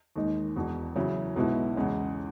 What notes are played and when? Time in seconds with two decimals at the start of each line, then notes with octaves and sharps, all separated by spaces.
0.16 D#2 D#3 G#3 D#4
0.56 E1 E2 B2
0.95 E2 C#3 F#3 C#4 E4
1.36 B1 B2 G#3 B3 E4
1.76 E2 C#3 G#3 C#4